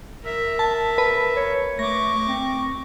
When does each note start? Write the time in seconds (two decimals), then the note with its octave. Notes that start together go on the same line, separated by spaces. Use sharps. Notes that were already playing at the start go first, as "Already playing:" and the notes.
0.23 A#4 E5
0.59 A5
0.98 B4
1.36 C#5
1.79 A3 C#6 D6 A#6
2.27 C4